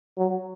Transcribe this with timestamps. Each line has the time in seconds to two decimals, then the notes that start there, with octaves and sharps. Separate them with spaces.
0.18 F#3